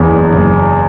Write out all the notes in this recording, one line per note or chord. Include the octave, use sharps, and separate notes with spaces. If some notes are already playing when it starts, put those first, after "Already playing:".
Already playing: F#1 E2
F#1